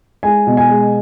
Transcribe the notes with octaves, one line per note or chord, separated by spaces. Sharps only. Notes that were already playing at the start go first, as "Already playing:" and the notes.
G#3 G#5
B2
G#5
G#3